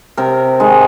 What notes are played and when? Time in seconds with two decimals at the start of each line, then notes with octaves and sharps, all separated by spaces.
0.17 C3 A#4
0.60 D#3 G#3